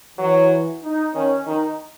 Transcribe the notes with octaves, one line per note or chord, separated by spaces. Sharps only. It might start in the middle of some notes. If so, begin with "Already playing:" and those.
E3 F#3
D#4
D#3 C#4
D#3 D#4